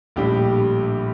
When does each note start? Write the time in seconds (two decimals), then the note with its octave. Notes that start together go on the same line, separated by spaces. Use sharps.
0.16 A#1 A2 G3 D4 G4